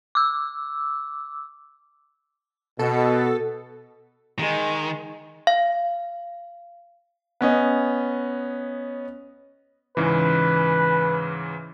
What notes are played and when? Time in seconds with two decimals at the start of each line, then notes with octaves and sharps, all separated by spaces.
0.15 D6 E6
2.79 B2 A4
4.39 D#3 G#3
5.47 F5
7.41 B3 C#4 D#5
9.97 G#2 C#3 E3 B4